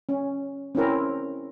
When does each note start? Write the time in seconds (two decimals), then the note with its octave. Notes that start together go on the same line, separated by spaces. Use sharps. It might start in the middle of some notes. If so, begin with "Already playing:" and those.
0.09 C#4
0.75 C4 C#4 E4 A#4